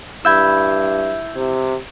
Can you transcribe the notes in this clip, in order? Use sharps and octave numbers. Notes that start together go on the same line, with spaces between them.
G2 E4 E6 G6 G#6
C3